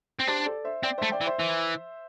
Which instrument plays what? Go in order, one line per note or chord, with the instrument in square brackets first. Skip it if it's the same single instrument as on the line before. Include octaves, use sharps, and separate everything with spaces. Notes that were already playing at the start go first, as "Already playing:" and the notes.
[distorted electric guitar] C4
[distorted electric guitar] D4 [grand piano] G4 C5
[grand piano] A4 D5
C5 E5
[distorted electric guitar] C4 [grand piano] D5 G5
[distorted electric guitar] A3 [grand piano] C5 E5
[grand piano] D5 G5
[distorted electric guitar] E3
[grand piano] C5 E5
[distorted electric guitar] E3